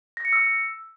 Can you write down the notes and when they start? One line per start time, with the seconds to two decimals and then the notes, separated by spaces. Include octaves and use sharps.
0.17 A#6
0.25 C#7
0.33 E6